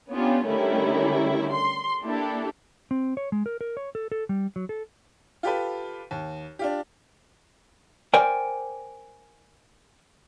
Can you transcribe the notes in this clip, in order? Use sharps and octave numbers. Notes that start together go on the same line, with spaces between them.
B3 C#4 D4 F4 G4
D3 D#3 G3 A3 C#4 E4
C6
A#3 D4 E4 G4 A4
C4
C#5
G#3
A#4
A#4
C#5
A4
A4
G3
F#3
A4
F4 G4 A4 B4
D#2
D4 F4 G4
A#4 C5 D5 G5 G#5